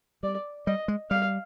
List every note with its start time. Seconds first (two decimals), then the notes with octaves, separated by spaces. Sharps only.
0.23 G3 D5
0.67 G3 D#5
0.88 G#3
1.10 G3 F5